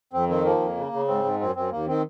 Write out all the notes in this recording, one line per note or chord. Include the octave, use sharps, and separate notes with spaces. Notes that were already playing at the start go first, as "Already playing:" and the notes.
F2 C4
D#3 C4
F3 A#3
F2
C#3
C#3
G#2 C4
G#2
F#2 C4
F#2 C4
D#2 A#3
D#3 C4